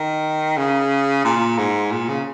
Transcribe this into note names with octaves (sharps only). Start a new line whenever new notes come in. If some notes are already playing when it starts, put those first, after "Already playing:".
Already playing: D#3
C#3
A#2
G#2
A#2
C#3